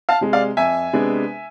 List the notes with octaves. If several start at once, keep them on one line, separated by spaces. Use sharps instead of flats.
F5 A5
C3 G#3
D5 F5
F2 E5 G#5
C3 G#3 B3 D4